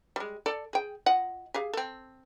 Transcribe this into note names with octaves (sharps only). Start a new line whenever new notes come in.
G3 G#3
A4 D5
G#4 G5
F4 D#5 F#5
G4 G#4 F5
C4 A4